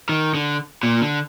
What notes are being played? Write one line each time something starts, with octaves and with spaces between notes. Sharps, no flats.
D#3
D3
A#2
D3